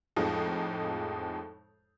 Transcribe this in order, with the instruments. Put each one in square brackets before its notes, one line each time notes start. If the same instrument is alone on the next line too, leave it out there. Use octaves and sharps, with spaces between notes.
[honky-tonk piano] F2 A2 F3 G#3 D#4